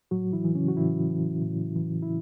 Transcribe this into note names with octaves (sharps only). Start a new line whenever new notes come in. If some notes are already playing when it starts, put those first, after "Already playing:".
A2 F#3 F#4
E3 E4
E3
C#3 C#4
F#4
A2 E3 E4
E3
A2
E3
E4